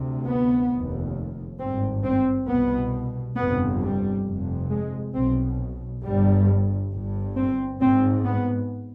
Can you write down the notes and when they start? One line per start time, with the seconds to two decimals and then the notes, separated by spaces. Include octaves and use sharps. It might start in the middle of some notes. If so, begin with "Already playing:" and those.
Already playing: D2 C3
0.25 B3
0.70 F1 D#2
1.58 G#1 G2 C4
2.03 C4
2.48 C2 B2 B3
3.36 G1 F2 C3 B3
3.81 G3
4.25 F1 F2 C3
4.70 G#3
5.14 B1 B2 C4
6.02 G1 G2 G3
6.92 G1 G2
7.35 C4
7.80 G#1 G#2 C4
8.24 B3